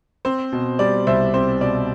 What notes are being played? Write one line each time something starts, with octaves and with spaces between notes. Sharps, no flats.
C4 C5
B2
G3 D5
C2 C5 E5
C4 C5
B2 D5